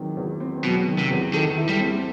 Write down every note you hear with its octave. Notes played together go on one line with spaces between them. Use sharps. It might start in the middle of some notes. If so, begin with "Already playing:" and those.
Already playing: E2 D#3 F#3 C4
E2
C4
B2 F#3
D#3
C3
E2
D#3 A4
E4
G3
C4